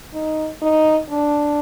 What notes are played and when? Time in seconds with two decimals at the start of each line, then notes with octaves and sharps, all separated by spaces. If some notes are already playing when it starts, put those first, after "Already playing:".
0.14 D#4
0.62 D#4
1.10 D4